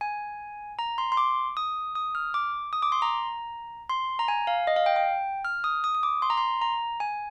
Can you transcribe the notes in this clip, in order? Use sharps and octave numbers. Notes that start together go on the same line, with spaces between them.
G#5
A#5
C6
C6
D6
D#6
D#6
F6
D6
D#6
D6
C6
A#5
C6
A#5
G#5
F5
D#5
F5
G5
G5
F6
D#6
D#6
D#6
D6
C6
A#5
C6
A#5
G#5